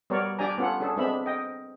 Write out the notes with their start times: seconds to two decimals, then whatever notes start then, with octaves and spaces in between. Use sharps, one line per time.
0.10 G3 B3 A#4 C#5 D5
0.39 D4 G4 D5 G#5 A#5
0.58 B3 C#4 F4 A4 F#5
0.80 C#4 D4 G#4 A4
0.96 G#3 B3 C4 D4 E5 B5
1.26 D#5 G5